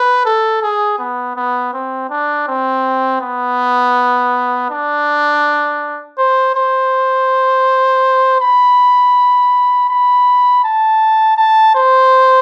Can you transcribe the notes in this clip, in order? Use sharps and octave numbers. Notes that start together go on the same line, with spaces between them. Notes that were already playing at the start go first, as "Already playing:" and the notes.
Already playing: B4
A4
G#4
B3
B3
C4
D4
C4
B3
D4
C5
C5
B5
B5
A5
A5
C5